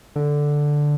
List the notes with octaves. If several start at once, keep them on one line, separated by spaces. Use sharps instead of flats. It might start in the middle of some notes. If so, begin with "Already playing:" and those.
D3